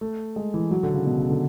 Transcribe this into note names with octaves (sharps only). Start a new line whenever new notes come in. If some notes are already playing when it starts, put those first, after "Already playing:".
A3
G#3
E3
F#3
D3
C#3
B2
C#3
D3